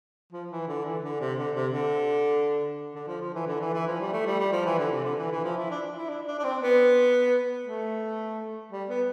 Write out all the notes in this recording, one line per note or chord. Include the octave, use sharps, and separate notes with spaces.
F3
E3
D3
E3
D3
C3
D3
C3
D3
D3
F3
F3
E3
D3
E3
E3
F3
G3
A3
G3
G3
F3
E3
D3
C3
D3
E3
E3
F3
E4
D4
E4
D4
D4
D4
C4
B3
A3
G3
B3